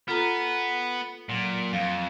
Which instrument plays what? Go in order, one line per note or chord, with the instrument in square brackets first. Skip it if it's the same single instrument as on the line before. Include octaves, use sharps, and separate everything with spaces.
[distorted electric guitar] B3 [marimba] F4 A4 A#5
[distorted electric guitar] A#2 [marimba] F#3
[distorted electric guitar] F2 [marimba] F5